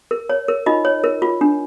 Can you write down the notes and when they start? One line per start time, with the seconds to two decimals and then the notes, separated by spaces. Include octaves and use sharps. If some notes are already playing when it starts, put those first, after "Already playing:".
0.11 A#4
0.29 C#5
0.48 A#4
0.66 D#4 F4 D#5
0.85 C#5
1.04 A#4
1.22 F4
1.41 D4